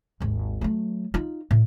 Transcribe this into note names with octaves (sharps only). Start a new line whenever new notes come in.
G#1 D#2
F#3 A3
D#4 F4
A2